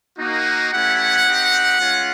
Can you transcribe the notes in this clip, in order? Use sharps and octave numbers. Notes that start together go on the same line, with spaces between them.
A#3 D#4 F#4
A3 C#4 E4 G4 F#5
C4 D#4 G4
G#3 C#4 F4